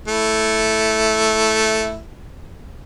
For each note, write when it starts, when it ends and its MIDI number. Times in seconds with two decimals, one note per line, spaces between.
0.08 2.00 57
0.08 2.00 64